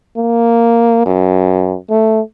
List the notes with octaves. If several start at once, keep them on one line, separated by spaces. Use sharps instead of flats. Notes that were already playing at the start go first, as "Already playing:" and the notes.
A#3
F#2
A3